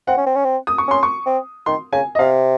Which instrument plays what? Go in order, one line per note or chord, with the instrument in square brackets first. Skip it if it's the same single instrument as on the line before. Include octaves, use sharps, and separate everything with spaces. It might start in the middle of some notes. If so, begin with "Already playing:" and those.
[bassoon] C4 [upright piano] F#5
[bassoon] C#4
C4
C#4
C4
[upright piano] D#6
C#6
[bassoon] C#4 [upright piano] C6
[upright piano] C#6
[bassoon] C4
[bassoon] D#3 [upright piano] C6
[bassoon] C#3 [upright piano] G#5
[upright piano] D#5
[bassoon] C3 [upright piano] F5